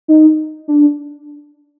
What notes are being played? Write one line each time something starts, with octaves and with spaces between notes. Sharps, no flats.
D#4
D4